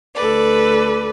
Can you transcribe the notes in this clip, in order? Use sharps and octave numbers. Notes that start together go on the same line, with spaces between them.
D2 A4 B4 D5